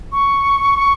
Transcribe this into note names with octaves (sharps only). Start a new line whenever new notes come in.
C#6